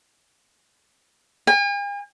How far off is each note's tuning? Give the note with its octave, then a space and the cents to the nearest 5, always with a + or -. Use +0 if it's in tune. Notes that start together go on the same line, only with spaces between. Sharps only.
G#5 -45